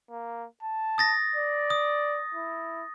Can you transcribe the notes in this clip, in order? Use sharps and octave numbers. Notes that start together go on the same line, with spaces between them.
A#3
A5
D#6 A6 A#6
D5
D#6
E4